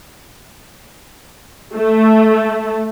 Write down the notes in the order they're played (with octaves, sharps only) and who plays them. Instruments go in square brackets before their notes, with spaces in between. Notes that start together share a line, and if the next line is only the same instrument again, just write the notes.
[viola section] A3